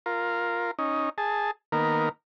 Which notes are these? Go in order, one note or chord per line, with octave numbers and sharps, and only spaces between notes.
F4 A#4
C#4 D#4
G#4 A5
D#3 A#3 B3 A#4